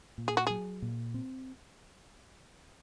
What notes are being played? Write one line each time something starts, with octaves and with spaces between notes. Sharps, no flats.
A#2
G#4
F#4
F#3 G#4
A#2
C4